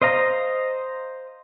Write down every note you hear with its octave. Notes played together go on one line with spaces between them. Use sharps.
C5 D#5 F5 A#5